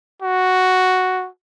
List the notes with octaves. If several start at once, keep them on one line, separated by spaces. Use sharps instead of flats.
F#4